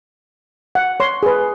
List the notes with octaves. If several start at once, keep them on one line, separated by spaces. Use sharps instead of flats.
F#5
C#5 C6
G#4 B4